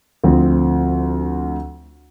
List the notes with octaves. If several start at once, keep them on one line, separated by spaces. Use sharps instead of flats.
D2 F3 C4